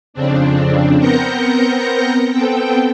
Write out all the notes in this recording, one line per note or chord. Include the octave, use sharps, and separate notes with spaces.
F2 C#3 C4 D4
B3 C4 A#4 G6 A#6 C#7
B3 C4 A4 G5